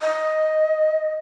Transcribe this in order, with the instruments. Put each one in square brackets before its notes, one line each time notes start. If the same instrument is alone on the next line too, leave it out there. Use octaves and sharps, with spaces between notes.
[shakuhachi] D#5